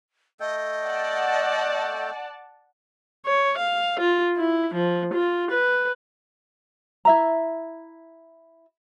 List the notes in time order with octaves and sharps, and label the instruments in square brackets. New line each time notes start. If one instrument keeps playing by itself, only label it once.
[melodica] A3 A4 G5 [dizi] D#5
[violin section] D5 F#5 A5
[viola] C#5
F5
F4
E4
F3
F4
B4
[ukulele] E4 E5 A#5